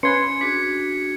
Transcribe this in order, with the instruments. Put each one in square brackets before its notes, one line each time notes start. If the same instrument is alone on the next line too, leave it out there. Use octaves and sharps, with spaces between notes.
[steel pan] C#4 B4 C6 [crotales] G#6 C#7
[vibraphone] D4 F#4 G#4 [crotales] B6